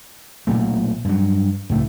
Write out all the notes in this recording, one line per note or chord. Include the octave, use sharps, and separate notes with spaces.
B1 A#2 A3
G2 F#3
C#2 A2 A3